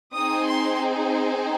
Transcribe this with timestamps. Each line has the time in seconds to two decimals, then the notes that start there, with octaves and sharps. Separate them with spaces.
0.15 C4 D#4 G#4 D#6
0.45 C6